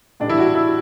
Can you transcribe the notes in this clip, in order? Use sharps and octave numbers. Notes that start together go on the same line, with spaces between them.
A2 E3 G3 D4
E4
F#4
E4